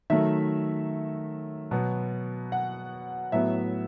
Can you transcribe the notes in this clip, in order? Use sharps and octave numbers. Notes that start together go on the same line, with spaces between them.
D#3 F#3 A3 E5
B2 F#3 B3
F#5
A2 F#3 B3 E5